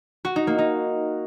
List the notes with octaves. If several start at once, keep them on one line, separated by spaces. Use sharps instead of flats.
F#4
D#4
A#3
D#4